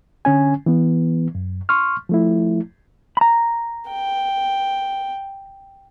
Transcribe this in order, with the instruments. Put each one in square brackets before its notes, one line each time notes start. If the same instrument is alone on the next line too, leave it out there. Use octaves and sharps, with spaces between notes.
[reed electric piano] D3 C#4 G#5
E3 B3
F#2
C6 C#6 F6
F3 A3 E4
[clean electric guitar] A#5 B5
[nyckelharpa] G5